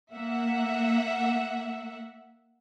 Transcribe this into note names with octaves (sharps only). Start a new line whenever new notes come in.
A#3 E5 F#5